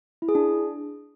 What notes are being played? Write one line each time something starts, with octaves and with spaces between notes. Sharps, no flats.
E4
G#4
D4